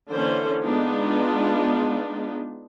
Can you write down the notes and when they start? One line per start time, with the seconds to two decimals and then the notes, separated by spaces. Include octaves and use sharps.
0.10 D3 E3 A#3 C#4 C5
0.61 G#3 B3 D4 D#4 F4